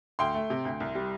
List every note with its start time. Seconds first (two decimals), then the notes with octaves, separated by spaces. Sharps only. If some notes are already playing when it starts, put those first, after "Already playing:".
0.19 D2 G5 C6
0.34 A3
0.50 C3
0.65 D2
0.80 C2
0.95 G3